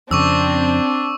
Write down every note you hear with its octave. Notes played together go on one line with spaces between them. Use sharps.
F2 C#3 C4 D4 C#6 D6 E6